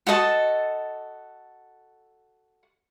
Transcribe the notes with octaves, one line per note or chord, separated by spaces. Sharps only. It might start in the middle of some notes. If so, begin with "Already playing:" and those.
F#4 A4 D#5 A5